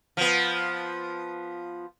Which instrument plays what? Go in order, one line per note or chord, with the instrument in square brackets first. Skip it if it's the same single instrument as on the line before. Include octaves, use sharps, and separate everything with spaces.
[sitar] F3 B3